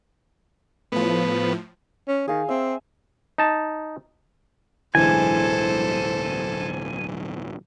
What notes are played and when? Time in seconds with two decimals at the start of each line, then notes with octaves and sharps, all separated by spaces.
0.92 A2 F3 B3
2.08 C#4
2.28 D#3 G#4 F5
2.49 C4 E5
3.38 D#4 A5
4.95 D1 B1 D3 E3 G#3 A4 C5 G#5